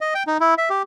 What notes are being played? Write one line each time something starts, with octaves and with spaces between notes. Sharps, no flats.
D#5
G5
D#4
E4
E5
G4